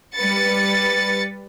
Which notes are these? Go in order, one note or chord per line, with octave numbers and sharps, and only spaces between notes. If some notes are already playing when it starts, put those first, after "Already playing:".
G3 B4 A6 C#7